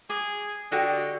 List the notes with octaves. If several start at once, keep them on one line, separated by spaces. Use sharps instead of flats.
G#4 D6
D3 F#4 G4 D#5